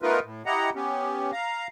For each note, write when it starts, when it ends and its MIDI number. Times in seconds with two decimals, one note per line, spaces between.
0.02 0.19 57
0.02 0.19 59
0.02 0.19 63
0.02 0.19 65
0.02 0.19 70
0.02 0.19 71
0.24 0.42 45
0.46 0.70 64
0.46 0.70 67
0.46 0.70 75
0.46 0.70 78
0.46 0.70 82
0.75 1.31 59
0.75 1.31 61
0.75 1.31 67
1.32 1.67 77
1.32 1.67 82